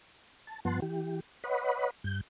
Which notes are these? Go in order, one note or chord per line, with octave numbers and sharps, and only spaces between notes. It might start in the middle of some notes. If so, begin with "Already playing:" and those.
A5
G2 F3 B3 F#5 A5 C6
E3 G4
B4 C#5 D#5 F#5 B5
G2 G6